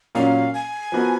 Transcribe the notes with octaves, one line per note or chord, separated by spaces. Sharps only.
A#2 F#3 A#3 C#4 F5
G#5
F3 B3 F#4 A#4